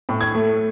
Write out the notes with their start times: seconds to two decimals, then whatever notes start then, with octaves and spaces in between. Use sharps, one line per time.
0.09 A2
0.21 G#6
0.35 A3